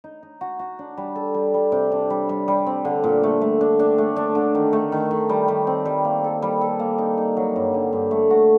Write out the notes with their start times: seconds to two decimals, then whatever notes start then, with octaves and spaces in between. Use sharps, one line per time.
0.04 D#4
0.23 D#4
0.41 F#4
0.59 F#4
0.79 D4
0.97 G3
1.16 A4
1.34 G3
1.54 G3
1.72 C3
1.92 D4
2.10 G3
2.29 G3
2.48 G3
2.67 C4
2.85 D3
3.04 A#2
3.23 A3
3.41 A3
3.61 D4
3.79 D4
3.98 A3
4.16 D4
4.35 D3
4.55 D#3
4.73 A3
4.92 D#3
5.11 D#3
5.29 G3
5.48 G3
5.67 C4
5.85 G3
6.05 A#3
6.24 A4
6.42 G3
6.61 A4
6.80 A#3
6.98 D#4
7.18 D#4
7.37 F#3
7.56 G2
7.74 D3
7.93 G2
8.11 A3
8.30 F#4